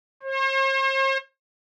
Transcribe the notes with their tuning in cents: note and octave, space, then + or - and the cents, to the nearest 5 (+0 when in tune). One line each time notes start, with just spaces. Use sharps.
C5 +45